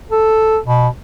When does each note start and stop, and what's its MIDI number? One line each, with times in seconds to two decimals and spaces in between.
0.10 0.58 69
0.66 0.88 47